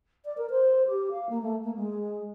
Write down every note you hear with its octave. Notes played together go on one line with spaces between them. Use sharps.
D5
A#4
C5
G4
F5
A#3
A3
A#3
G#3